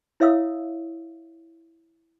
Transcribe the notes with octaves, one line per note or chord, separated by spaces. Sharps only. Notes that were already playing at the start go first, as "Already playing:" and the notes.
E4 C#5 E5 F5 D#6 E6